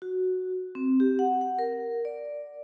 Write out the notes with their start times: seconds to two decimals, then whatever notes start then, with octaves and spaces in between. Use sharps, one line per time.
0.02 F#4
0.75 C4
1.00 G4
1.19 F#5
1.41 F#5
1.59 A#4
2.05 D5